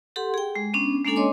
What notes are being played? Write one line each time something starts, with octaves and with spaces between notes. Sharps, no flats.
G4 A4 F#5 C6
G#4 G5
G#3
B3 C#4 D4
G#3 A#3 C#4 D4 A4 G#5
C#5 D#5 C6 D6